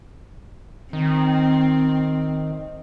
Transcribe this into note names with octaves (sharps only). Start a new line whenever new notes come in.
D#3 C4